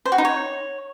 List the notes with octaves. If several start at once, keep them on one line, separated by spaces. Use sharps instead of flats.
C5
F#4
D#4
C#5